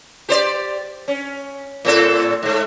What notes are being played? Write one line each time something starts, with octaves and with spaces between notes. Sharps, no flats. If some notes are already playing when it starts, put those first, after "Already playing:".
G4 C5 D5
C#4
A2 C4 A4
G#2 A3